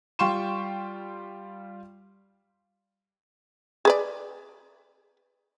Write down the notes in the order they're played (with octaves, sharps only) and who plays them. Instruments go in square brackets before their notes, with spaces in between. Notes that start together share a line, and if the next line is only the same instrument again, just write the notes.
[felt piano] G3 F4 G5 C6 C#6 E7
[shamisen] G#4 B4 D5